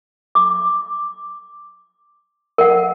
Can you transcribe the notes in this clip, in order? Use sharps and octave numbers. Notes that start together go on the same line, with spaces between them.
D6
A#4 F#5